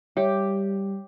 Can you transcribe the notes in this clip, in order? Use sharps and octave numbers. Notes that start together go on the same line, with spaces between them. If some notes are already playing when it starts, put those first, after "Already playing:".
G3 G4 C#5 E5